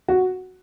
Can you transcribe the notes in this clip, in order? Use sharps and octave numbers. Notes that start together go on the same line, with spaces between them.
F#4